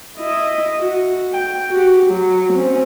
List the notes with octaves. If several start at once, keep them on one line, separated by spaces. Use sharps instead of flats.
E4 D#5
F#4
G5
F#4 G4
F#3
C4 C#4